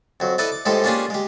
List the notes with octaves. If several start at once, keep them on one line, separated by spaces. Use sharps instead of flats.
F2 F#3
E4 A4 B4 D5 D#5
D6
A2 F3 G#3 D#4 G4 A4
A#3 C#4 D4 F4 G4 G#4
G#3 G4